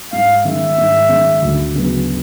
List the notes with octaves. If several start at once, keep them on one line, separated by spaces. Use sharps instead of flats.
G#2 F5
D#3 G#3 C#4 E5
G#2
D#3 G#3 C#4
D2
C#3 F#3 B3